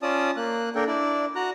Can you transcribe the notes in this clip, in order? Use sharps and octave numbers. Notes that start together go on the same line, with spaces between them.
C#4 F4 D5 A5 D#6
A#3 F#6
A#3 D4 A4 A#4 G5
D4 E4 D5
F#4 A#5 F#6